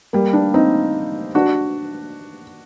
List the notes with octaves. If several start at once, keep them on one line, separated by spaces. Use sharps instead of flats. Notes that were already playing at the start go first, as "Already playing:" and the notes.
G3 A#3
A#3 D4
C4 D#4
D4 F#4